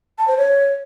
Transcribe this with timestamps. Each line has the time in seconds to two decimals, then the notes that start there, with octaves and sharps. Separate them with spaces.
0.18 A5
0.28 C5
0.37 C#5